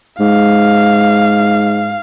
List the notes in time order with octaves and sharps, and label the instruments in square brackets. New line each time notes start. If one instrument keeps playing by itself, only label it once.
[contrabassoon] G#2 [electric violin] F5